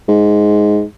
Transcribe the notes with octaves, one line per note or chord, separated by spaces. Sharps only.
G#2